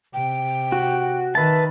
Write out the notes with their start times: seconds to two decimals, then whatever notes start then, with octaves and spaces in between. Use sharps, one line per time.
0.14 C3 G5
0.72 F#4
1.35 D#3 B4 E5 A5